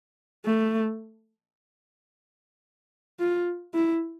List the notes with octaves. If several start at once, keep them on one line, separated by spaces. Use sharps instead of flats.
A3
F4
E4